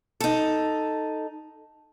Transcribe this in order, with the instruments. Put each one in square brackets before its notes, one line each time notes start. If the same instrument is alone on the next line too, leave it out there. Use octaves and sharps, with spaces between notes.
[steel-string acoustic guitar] D#4 A4